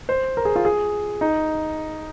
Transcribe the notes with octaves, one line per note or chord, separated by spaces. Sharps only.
C5
A#4
G#4
F4
G#4
D#4